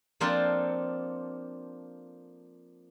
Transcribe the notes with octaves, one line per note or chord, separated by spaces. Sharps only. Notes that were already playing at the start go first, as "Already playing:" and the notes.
F3 A#3 C4 D4 F4 A4